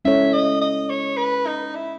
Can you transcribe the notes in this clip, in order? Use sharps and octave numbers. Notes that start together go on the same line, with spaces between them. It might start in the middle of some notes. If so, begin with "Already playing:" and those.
G#3 C#4 E4 A4 C#5 E5
D#5
D#5
C#5
B4
D#4
E4